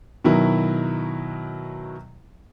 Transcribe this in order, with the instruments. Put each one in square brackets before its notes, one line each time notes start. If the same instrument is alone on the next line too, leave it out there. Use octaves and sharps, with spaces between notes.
[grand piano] B2 D#3 F#3 E4